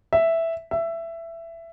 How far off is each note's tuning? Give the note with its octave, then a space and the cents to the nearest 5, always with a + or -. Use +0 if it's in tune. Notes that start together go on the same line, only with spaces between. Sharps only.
E5 +0
E5 +15